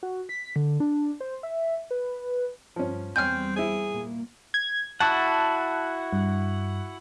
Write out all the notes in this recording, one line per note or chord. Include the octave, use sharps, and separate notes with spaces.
F#4
B6
D3
D4
C5
E5
B4
G2 F3 C#4
E2 G3 C4 C#5 G5 G#5 F6 G6
C4 E4 G#4
A#2 A#3
G#6
E4 F#4 F#5 A5
G2